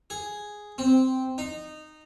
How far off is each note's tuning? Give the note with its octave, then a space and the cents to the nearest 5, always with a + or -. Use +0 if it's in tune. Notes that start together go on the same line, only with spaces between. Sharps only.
G#4 +0
C4 -5
D#4 -15